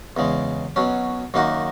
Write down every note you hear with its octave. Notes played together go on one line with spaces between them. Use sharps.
E2 C#3 G#3
B2 F#3 C#4
F#2 D#3 A#3 D#4 F#4